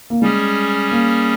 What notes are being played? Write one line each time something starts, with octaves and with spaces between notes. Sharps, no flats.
A#3
G3 G#3 C#4 G#4
A#3